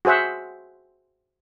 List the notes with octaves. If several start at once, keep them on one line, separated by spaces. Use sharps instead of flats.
F#4 G#4 C5 E5 F#5